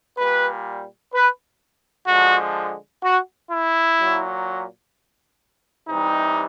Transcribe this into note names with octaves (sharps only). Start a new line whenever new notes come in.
A#2 G3 B4
B4
D3 F3 G#3 F#4
F#4
E4
A#2 F#3
C3 E3 G3 D#4